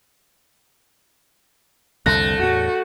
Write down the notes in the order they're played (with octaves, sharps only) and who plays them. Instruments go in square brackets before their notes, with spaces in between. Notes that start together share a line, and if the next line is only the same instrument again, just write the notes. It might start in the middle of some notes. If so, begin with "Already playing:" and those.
[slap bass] C2 F2 D3 [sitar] A3 [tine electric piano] F#6 A#6
[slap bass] E2 A2 [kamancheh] F#4